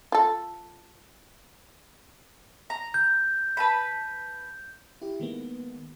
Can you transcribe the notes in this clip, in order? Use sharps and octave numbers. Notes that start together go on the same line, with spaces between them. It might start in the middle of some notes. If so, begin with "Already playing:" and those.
F4 A4
A#5
G6
B4 A5 B5
E4 G4
D#3 G#3 A#3 B3